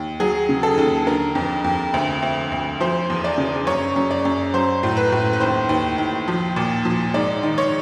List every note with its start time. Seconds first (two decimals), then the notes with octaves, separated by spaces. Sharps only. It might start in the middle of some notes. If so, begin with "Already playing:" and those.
Already playing: D#2
0.20 F#3 G#4
0.49 C#3
0.63 A4
0.78 D#2
1.07 D3 A#4
1.35 F2
1.64 F2
1.94 D2
2.22 D2
2.52 D2
2.80 F3 C5
3.10 E2
3.24 D5
3.38 C#3
3.67 F#2 C#5
3.96 F#2
4.11 D5
4.25 F#2
4.54 F#3 C5
4.83 A2
4.97 B4
5.12 A2
5.33 B4
5.40 D#2 C5
5.69 D#2
5.98 D#2
6.28 F3
6.56 A#2
6.85 F3
7.14 G#2 D5
7.43 D#3
7.58 C#5